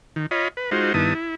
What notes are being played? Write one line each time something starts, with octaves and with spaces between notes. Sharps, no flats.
D#3
F4 C#5 D#5 B5
B4
G#3 D#4 F4 F#4 C5
G2 D#3 B3 E4 A5 D#6
E4